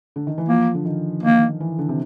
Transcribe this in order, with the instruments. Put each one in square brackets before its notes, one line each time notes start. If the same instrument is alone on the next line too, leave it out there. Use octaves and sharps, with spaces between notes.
[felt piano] D3
D#3
E3
[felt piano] F3 [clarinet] A#3
[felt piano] D3
D#3
[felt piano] D#3 [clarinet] A#3
[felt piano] E3
D3
C3